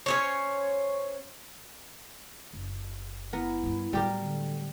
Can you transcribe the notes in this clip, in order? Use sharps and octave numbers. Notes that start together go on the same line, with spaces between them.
C#4 C5 C#5
F#1
B3 E4 A#4
G2 G3
A2 F#3 G3 G4 A#4
D3